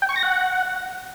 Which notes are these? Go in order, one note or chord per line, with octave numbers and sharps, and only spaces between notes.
G5
C#6
A#6
F#5